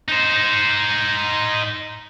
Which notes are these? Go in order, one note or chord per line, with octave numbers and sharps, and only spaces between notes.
D#4 C5